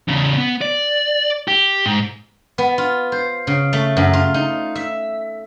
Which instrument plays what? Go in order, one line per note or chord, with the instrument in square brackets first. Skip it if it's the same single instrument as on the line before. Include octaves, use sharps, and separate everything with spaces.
[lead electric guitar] E2 C#3
B3
D5
G4
G#2
[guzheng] B3
F4
C5
C#3
A3
F#2
F4
D#4
E5